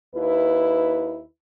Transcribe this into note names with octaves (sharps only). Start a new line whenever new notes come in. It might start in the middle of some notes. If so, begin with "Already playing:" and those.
D#2 E4 B4